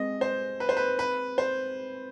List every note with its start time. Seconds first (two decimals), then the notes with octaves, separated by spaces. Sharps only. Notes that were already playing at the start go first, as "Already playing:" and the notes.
Already playing: G#3 C4 D#5
0.21 C5
0.60 B4
0.69 C5
0.77 B4
0.99 B4
1.38 C5